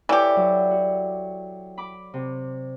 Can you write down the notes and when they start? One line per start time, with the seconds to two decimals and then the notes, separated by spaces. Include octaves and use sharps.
0.09 E3 G4 A4 C#5 D5
0.36 F#3
0.71 F#4
1.78 B5 D6
2.14 C3